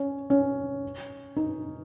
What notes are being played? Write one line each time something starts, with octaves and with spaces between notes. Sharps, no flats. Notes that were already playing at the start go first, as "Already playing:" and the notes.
Already playing: C#4
C#4
D#4